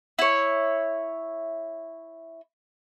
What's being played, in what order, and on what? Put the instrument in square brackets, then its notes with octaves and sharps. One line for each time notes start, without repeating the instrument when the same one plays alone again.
[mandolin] E4 C#5